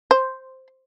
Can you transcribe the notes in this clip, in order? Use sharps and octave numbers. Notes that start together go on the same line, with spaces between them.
C5